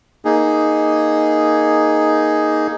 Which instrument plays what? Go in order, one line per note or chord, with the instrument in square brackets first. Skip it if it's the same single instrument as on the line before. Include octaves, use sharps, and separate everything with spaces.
[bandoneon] A#3 D#4 G#4